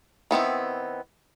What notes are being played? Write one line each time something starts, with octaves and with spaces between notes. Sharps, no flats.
D#3 B3 C4 E4